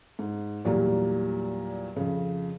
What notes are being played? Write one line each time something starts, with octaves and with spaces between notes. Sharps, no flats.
G#2
E2 A#2 F#3 G3 A#3
F2 C#3